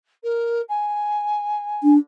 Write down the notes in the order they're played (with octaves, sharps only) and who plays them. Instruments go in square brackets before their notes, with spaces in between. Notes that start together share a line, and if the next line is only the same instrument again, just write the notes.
[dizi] A#4
G#5
[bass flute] D4